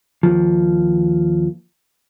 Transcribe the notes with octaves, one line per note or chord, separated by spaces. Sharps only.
D#2 F3